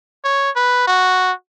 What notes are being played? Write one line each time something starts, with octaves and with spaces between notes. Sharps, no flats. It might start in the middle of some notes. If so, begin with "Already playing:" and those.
C#5
B4
F#4